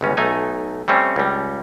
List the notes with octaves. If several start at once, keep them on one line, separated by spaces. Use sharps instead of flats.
G1 C#2 C#4
B1 A3 D#4 G#5
G3 A3 C4 C#4
C#2 G3